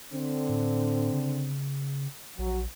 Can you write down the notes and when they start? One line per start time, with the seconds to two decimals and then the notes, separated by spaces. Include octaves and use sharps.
0.13 D3 C4
0.49 A2
1.13 C#3
2.39 A#1 F#3